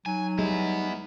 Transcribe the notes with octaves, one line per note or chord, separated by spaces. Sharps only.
F#3 D#4 G#5
G3 G#3 B3 E4